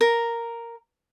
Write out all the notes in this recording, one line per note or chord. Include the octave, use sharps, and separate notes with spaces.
A#4